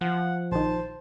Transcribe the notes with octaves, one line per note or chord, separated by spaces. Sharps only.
F3 F#5
A#1 D#3 C5 A5